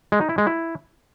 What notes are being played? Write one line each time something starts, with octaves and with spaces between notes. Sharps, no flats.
G#3
D#4
E4
G#3
E4